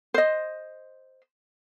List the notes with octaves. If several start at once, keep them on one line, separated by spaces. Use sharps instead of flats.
C5 D#5